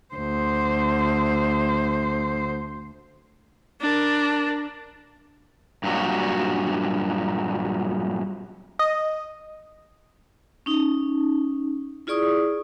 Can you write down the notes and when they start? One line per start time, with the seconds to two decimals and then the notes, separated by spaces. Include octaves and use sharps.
0.15 D2 C5
3.81 D4 A#4
5.84 G2 A#2 F#3 D4 F#4
8.79 D#5
10.66 C#4 D#4
12.07 E4 F4 G#4 D5 C#6 D#6